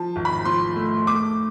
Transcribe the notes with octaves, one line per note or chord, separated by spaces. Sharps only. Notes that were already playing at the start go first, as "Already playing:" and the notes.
Already playing: F3 A5
G#1
B5
F3 C6
A3
A3 D6